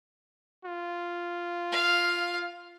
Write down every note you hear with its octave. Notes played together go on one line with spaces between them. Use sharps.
F4
F5